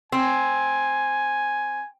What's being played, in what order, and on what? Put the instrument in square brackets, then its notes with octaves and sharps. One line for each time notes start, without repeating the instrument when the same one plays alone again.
[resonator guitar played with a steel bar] C4 [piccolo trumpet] G#5